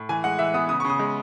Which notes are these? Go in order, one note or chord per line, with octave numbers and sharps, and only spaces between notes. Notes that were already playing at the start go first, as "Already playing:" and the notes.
Already playing: A2
E3 G#5
G#3 F#5
E3 E5
B3 D#6
C#3 D#6
C#6
C#3
D#6
G#3